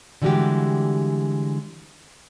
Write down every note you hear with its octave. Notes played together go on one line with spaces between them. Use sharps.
D3 E3 G3 G#3 F#4 G4